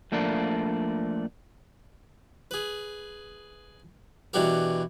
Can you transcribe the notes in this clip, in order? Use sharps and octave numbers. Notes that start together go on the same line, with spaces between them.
F3 A3 A#3 D4
G#4 B4
B2 E3 D4 F#4 G4 A#4